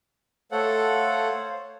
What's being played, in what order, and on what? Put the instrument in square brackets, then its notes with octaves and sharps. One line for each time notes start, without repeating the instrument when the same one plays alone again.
[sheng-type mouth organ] A3 A4 F#5 [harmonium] C5 C#5 F5